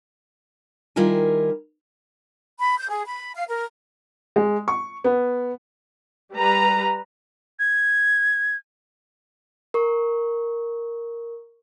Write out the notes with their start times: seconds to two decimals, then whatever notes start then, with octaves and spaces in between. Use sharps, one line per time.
0.96 D#3 G3 E4 F4 A#4 G#5
2.59 B5
2.78 G6
2.90 G#4
3.05 B5
3.34 F5
3.47 A#4
4.36 G#3
4.68 C#6
5.04 B3
6.34 G3 B4 A#5
7.59 G#6
9.74 A#4 C#6